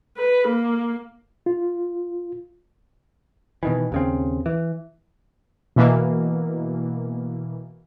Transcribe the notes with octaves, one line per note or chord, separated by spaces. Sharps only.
B4
A#3
F4
B2 D#3 E3
D#2 C#3 C4
E3
B2 E3 A#3